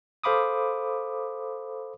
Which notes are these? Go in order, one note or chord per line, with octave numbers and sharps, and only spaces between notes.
A4 C5 F5 B5 D6 D#6